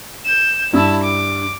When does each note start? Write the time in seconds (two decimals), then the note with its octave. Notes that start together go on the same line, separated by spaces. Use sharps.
0.25 G6 E7
0.73 G2 E4 A5 E6
1.03 D6